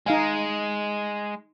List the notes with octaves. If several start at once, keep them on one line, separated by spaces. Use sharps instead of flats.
G#3 D#4 F5 G#5